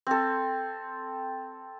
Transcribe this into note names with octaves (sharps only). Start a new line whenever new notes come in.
C4 A4